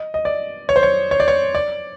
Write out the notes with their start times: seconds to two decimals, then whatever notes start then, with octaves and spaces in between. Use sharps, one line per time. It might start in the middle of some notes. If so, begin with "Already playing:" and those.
Already playing: D#5
0.14 D#5
0.25 D5
0.69 C#5
0.76 C5
0.83 C#5
1.11 C#5
1.20 D5
1.28 C#5
1.55 D5